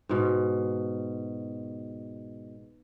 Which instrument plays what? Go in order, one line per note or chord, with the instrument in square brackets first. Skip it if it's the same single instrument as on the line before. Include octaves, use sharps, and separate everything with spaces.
[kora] G#2 B2